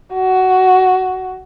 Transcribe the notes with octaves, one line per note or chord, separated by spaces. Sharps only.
F#4